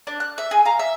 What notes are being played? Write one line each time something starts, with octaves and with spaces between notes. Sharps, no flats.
D4
F#6
E5
G#4 G#5
F5 A#5
E5